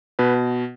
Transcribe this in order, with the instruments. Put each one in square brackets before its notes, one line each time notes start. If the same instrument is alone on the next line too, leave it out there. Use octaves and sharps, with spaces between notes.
[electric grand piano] B2 B4